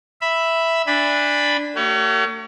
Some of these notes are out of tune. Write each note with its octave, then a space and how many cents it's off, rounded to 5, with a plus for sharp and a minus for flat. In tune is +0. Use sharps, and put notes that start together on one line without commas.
E5 +0 B5 +0
D4 +0 G#5 -25 B5 +0
A3 +45 G4 -45 C#5 +30